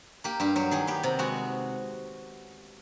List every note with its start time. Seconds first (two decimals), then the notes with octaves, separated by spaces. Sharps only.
0.24 A#3 G4
0.40 G2 G4
0.56 F#3 G4
0.71 D#3 G#4
0.87 B3 G4
1.03 C3
1.19 G#3 F#4